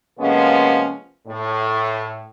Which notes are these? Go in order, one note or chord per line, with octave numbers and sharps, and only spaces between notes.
C3 F3 G#3 A#3 B3 C#4
A2